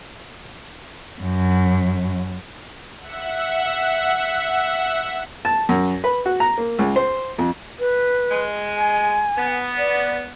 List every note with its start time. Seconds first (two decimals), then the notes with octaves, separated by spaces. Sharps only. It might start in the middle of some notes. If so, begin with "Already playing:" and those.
1.22 F#2
2.98 E5 F#5
5.45 A5
5.69 F#2
6.04 B4
6.26 F#4
6.40 A#5
6.58 A#3
6.79 C#2
6.96 C5
7.38 F2
7.80 B4
8.30 G#3
8.77 G#5
9.37 B3
9.78 D5